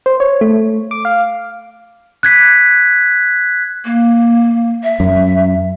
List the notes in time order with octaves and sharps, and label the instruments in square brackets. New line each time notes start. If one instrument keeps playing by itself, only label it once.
[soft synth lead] C5
C#5
A3
D6
F5
[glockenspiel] F#6 G#6 B6
[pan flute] A#3
E5
[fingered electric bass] F#2